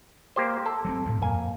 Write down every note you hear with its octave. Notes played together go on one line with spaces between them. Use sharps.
A#3 G4 C5
A4
F#3 A#3 C4
D2 A2
F2 A#3 G#5